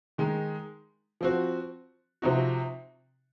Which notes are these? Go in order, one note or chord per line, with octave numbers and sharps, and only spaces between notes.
D#3 G#3 D#4
F3 C4 F#4
C3 F3 C4 D#4 F#4